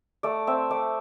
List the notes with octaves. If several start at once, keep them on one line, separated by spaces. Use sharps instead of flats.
A3 D5
C4 E5
A3 D5